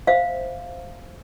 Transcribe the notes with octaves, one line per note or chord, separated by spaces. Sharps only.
C5 E5 F5